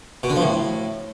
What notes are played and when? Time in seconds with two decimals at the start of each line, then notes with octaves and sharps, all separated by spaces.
0.23 B2
0.30 D3
0.36 F3
0.42 A2